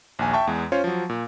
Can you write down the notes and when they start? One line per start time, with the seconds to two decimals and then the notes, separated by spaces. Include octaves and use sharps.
0.19 A#1 D#2 G#5
0.33 E5 G5 A5 C#6
0.47 E2 G#3
0.72 C#4 F4 C5 C#5
0.84 F3 F#3
1.09 A#2